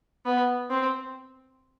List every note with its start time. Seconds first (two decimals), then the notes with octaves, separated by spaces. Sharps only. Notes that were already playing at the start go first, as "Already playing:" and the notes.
0.25 B3
0.70 C4